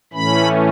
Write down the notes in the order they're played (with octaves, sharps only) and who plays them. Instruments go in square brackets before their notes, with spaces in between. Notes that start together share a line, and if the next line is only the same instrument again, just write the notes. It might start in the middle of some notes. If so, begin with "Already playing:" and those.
[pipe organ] A2 E3 A3 C#4 B5